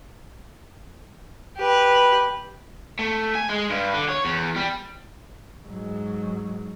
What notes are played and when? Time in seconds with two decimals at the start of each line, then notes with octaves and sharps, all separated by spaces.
1.57 G4 B4
2.99 A3
3.35 G#5
3.49 G#3
3.70 G2
3.94 D3
4.09 C#5
4.25 E2
4.56 G3
5.67 G#2 F#3